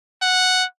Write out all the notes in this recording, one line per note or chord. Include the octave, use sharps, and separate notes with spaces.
F#5